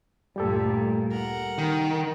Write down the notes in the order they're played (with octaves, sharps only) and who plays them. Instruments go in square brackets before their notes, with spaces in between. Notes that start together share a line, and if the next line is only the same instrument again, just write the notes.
[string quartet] D2 G2 A#2 [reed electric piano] G3 G4 A4
[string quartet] A#4 F#5
[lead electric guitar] D#3